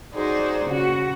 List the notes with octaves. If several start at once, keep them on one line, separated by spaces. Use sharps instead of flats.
D#4 F#4 G#4 C5 D5
C#3 F#4